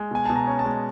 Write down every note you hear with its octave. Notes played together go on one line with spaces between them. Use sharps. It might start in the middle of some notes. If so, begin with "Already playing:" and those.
Already playing: G#3
B2 G#5
B2 A5
A#5
C#4
A5
G#3